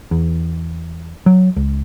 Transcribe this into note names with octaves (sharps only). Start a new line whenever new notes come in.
E2
F#3
C#2